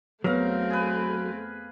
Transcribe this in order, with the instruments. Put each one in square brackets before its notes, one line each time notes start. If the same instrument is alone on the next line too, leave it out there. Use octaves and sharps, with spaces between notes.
[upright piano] E2 B3 [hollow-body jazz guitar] F#3 [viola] A3 C4 [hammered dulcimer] A#4 F5
[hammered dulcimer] G#4 B4